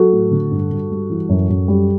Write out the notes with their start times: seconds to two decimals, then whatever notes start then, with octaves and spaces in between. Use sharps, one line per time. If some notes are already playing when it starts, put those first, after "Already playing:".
Already playing: F#3 F#4 A4
0.12 A2
0.31 D3
0.51 G2
0.71 G2
0.90 G3
1.10 E3
1.29 F#2
1.49 F#2
1.68 G3